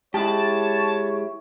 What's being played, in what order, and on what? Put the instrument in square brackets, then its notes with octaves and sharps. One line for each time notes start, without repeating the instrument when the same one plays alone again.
[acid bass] G#3 [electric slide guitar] E4 G4 [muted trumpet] C#5 [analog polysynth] A5